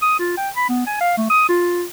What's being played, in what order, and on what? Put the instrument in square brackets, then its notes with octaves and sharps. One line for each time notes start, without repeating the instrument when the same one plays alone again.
[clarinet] D#6
F4
G5
B5
B3
G#5
F5
A3
D#6
F4